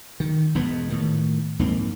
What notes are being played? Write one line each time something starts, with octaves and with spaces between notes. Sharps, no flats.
D#3
E1 E2 G#2 B3
A2 D#3
F2 G#2 A#3 C4